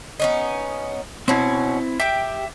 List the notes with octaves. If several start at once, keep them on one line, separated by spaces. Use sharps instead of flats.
B3 C#4 D#4
B2 C4 C#4 E4
G4 E5 G5